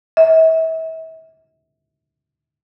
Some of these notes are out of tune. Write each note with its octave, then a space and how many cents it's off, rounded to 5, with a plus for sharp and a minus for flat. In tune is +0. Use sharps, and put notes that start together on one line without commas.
E5 -35